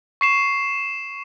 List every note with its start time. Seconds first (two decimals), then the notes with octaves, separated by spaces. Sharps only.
0.21 C#6 C7 E7